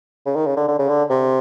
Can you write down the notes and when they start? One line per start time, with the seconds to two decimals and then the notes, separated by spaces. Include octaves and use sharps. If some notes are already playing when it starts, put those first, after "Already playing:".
0.26 C#3
0.36 D#3
0.46 C#3
0.57 D3
0.68 D3
0.79 C#3
0.89 D3
1.10 C3